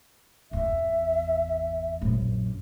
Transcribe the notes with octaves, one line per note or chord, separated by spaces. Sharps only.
G#1 E2 E5
A#1 F#2